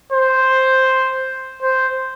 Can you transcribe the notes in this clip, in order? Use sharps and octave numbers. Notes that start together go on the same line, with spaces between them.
C5
C5